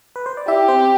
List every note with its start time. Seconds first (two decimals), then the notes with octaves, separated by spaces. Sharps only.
0.16 B4
0.26 C5
0.37 D5
0.48 E4 G4 E5
0.68 C4 C5